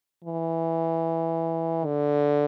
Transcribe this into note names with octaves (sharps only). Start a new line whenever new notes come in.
E3
D3